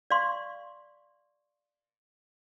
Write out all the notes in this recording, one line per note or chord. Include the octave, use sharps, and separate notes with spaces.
D5 F5 C6 C#6